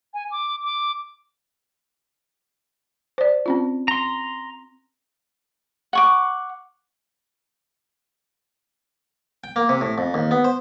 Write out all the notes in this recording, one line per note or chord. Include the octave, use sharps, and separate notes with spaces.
G#5
D6
D6
C5 D5
C4 C#4 F4
A#5 C6
F#5 C#6 D6
G5
A#3
C3
A2
F2
D#2
B3
C5